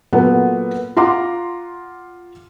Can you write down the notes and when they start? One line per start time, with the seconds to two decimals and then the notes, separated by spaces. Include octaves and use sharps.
0.13 A#2 F#3 A#3 B3 F#4 A4
0.97 F4 F#5 A#5 C6 D6